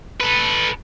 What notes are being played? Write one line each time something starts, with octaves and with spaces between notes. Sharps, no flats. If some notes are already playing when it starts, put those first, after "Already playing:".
A4 B4